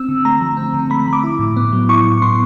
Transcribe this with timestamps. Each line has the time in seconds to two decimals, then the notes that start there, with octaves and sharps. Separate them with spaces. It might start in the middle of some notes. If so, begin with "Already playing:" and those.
Already playing: C4 E6
0.09 D3
0.25 A3 A#5
0.41 F3
0.57 C4
0.74 D3
0.90 A3 B5
1.07 F3
1.13 D6
1.24 E4
1.39 A2
1.56 B3
1.73 F#3
1.89 E4 C#6
2.05 A2
2.22 B3 C6